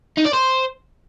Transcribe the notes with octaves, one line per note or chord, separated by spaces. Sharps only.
D#4
D5
C5